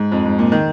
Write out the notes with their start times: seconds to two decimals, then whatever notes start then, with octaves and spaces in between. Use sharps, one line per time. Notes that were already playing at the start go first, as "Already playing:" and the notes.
Already playing: G#2
0.12 F2
0.25 G#2
0.39 A#2
0.52 D#3